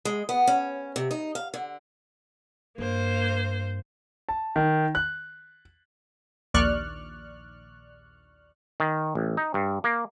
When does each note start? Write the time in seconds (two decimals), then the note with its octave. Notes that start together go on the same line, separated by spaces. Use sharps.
0.05 G#3
0.29 B3
0.47 C#4
0.96 C3
1.11 D#4
1.35 F5
1.54 D3
2.78 G2 A#3 C5
4.29 A5
4.56 D#3
4.95 F#6
6.54 A#1 D#2 D5 C#6 F6 F#6
8.80 D#3
9.15 A1
9.37 D#4
9.54 G2
9.84 A#3